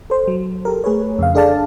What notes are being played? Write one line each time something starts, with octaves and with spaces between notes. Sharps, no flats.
A4 C5
F#3
G4 A4 A#4
A3 G#4 B4 C#5
F2 C#3 F5
D4 G#4 A4 D5 F5 A5